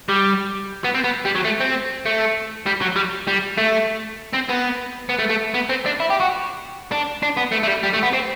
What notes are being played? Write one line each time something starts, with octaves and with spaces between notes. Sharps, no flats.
G3
B3
C4
B3
G3
F#3
A3
C4
A3
G3
F#3
G3
G3
A3
C4
B3
B3
A3
A3
B3
C4
D4
E4
G4
F#4
D4
D4
B3
A3
A3
G3
G3
A3
B3
C4